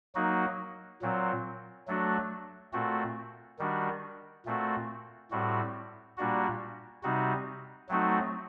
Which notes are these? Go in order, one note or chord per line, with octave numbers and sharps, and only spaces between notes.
F#3 A#3 D#4 F#4
A#2 F#3 C4
F#3 A3 D4 F#4
A#2 A3 C4 F#4
D#3 G3 D4 F#4
A#2 A3 C4 F#4
A2 G3 C4 F#4
A#2 G3 A#3 D4 F#4
C3 G3 C4 D#4 F#4
F#3 A3 C4 D#4 F#4